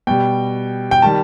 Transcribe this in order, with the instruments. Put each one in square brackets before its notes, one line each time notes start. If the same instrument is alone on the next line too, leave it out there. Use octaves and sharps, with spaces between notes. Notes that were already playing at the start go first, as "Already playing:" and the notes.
[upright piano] B2 G3 G5
G5
D#3 G3 A5